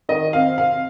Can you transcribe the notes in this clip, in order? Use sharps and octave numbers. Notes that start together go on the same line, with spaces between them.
D#3 D#5
C4 F5
C3 F5